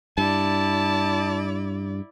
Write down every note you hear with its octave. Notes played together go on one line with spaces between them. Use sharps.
G2 E4 D5 A5